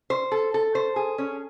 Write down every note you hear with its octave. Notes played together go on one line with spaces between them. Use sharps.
C5
A4
A4
C5
G#4
C#4